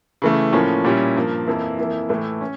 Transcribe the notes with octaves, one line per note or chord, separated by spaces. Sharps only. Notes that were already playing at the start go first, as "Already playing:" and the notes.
C#3 E3 A3
A2 F3 A#3 C#4
A#2 G3 C#4 E4
G2 F3 A#3
F2 E3 A#3 E4
F2 E3 A#3 E4
A2 E3 A3 E4
C#4